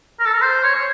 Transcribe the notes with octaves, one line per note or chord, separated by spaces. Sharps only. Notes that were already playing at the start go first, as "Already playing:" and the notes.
A#4
A4
A#4
C5
C#5
C#5